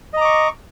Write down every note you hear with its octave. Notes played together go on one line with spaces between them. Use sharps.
D#5 A#5 C#6 D6